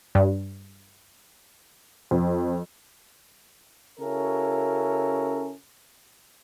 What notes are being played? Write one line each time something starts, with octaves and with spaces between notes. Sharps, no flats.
G2
F2
C#3 C#4 E4 F#4 A4 A#4